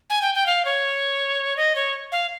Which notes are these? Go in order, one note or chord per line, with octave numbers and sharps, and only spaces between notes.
G#5
G5
G5
F5
C#5
D#5
C#5
F5